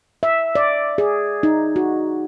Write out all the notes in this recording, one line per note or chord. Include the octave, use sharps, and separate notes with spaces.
E5
D5
G#4
D#4
F#4